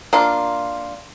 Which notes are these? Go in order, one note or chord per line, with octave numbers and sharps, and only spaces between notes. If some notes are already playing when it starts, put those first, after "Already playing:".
A#3 D4 F4